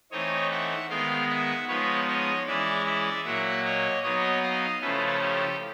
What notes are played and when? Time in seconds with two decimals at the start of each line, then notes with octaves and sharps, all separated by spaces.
0.11 E3 A3 C4 D#4 C#5 D#5
0.51 E5 F#5
0.90 D#3 G#3 B3 F5 G5
1.29 E5 F#5
1.68 F3 G#3 B3 D#4 B4 C#5
2.07 C#5 D#5
2.46 E3 G#3 C#4 E4 D5 E5
2.86 D5 E5
3.24 A#2 F#3 A#3 E5 F#5
3.64 C#5 D#5
4.03 F#3 B3 D#4 C#5 D#5
4.43 D#5 F5
4.81 C#3 F3 A3 C#4 E4 A4 B4
5.21 G4 A4